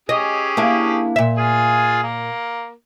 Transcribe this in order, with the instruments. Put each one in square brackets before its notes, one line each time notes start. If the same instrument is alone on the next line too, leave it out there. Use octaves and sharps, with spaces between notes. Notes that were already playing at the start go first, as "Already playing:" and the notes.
[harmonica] C#4 G4 G#4 [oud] D#5
[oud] A#3 D4 E4
A#2 E5
[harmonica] F4 G#4 G#5
A#3